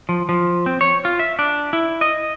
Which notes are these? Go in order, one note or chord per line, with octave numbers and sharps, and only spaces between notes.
F3
F3
C4
C#5
F4
E5
D4
E4
D#5